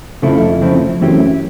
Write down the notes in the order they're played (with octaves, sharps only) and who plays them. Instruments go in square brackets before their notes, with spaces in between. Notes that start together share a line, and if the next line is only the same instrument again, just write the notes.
[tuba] F2 [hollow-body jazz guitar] C#3 F3 A3 C4 E4
[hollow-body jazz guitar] C#3 F3 A3 C4 E4
[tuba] F#2 [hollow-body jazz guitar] E3 A3 C4 E4 G4